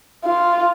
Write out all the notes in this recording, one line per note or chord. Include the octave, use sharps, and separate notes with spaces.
F4